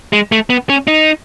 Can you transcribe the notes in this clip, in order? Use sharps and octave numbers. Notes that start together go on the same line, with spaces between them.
G#3
A3
B3
C#4
D#4